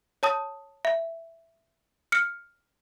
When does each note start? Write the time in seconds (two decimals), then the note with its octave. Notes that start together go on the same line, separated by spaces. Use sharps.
0.23 C#5 A5 D#6
0.85 E5
2.12 F6 C#7